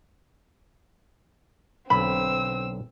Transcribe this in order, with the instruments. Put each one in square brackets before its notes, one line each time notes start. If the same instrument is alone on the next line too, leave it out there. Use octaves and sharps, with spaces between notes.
[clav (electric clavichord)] B1 D3 F5 [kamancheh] C4 E6 [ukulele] B5